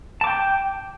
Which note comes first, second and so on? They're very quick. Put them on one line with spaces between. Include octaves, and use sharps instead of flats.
A5 D6 G5